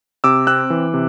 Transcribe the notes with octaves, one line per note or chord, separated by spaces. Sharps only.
C3 D6 E6
C4 E6 F#6
E3
C3